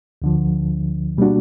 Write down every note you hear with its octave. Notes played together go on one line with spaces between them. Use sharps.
D2 D3 F3
B2 G3 A#3 D4 F#4